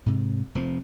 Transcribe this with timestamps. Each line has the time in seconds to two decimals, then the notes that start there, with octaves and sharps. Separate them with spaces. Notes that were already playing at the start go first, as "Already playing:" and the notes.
0.06 G#2 C3
0.55 F1 F3 C4